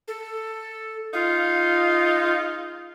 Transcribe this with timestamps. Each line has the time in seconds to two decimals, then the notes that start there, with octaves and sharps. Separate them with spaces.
0.08 A4
1.13 G#3 D#4 F4 F5